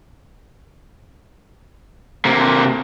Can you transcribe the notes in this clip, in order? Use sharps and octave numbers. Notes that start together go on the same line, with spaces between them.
C3 A#3